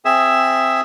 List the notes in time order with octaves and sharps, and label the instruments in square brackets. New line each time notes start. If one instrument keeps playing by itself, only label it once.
[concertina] C4 G#4 E5